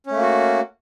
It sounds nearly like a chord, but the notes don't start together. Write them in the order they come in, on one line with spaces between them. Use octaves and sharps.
C#4 A3 A#3 F#4